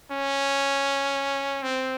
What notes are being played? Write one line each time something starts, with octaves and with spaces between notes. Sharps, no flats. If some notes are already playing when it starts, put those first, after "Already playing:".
C#4
C4